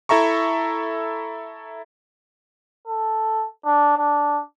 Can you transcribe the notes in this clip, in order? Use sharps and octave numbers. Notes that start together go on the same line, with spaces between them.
E4 A4 E5 A#5 C#6
A4
D4
D4